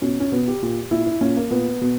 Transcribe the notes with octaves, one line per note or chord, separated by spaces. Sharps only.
B2 C#4
C#4
B2 B3
G4
A#2
A#2 E4
E4
A#2 C#4
A#3
A#2 B3
B2